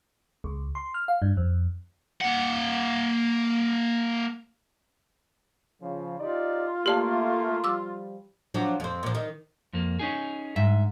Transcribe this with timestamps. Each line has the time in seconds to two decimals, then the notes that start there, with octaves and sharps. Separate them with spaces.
0.44 C#2
0.75 C6
0.94 F6
1.08 F5
1.22 G2
1.37 F2
2.21 A#3 F#5
5.82 C#3 F3
6.20 D#4 F4 G4 D5
6.86 A3 A#3 G4 D5 A5
7.64 F3 G3 D6 E6
8.54 F3 F#3 D4
8.80 F2 C4
9.03 A#2 F3
9.15 D#3
9.73 F2 A#3
9.99 C#4 D#4 G#4
10.56 G#2 E5